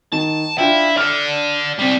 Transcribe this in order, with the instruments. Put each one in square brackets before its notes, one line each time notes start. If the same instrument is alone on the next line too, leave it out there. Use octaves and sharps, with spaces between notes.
[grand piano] D#3 [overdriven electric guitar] A5
[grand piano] D4 F4 G5 [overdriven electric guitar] E4
[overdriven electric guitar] A4 D5 [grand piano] F6 F7
[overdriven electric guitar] G3 C4